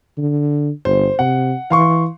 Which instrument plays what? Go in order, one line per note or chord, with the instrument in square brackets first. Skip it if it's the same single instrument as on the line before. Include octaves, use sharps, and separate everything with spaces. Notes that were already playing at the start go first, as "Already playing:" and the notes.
[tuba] D3
[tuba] G1 [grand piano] C5
[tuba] C3 [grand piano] F#5
[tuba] E3 [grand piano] F5 C6 C#6